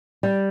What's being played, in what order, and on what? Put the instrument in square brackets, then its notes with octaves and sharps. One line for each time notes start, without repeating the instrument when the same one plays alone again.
[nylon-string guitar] G3